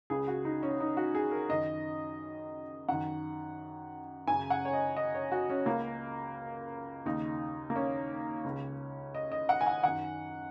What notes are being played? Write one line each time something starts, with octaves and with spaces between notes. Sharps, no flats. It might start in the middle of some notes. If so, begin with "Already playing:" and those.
C#2 C#3 G#4
F#4
D#4
C#4
D#4
F#4
G#4
A#4
F#2 D#3 D#5
F#2 D#3 F#5
F#2 C#3 G#5
F#5
C#5
D#5
D#5
C#5
F#4
C#4
C#2 C#3 A#3
D#2 C#3 D#4
A#3
C#4
C#2 C#3
D#5
D#5
F#5
G#5
F#5
F#2 D#3 F#5